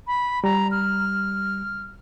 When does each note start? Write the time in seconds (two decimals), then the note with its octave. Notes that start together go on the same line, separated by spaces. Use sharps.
0.07 B5
0.44 G3 A#5
0.71 F6